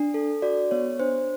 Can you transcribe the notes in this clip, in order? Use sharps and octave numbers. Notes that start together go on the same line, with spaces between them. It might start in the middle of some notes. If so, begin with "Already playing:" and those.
Already playing: D4
A4
F#4 D5
B3 C#5
D4 C5